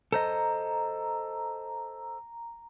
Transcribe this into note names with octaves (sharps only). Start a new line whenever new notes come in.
A4 C5 D#5 A#5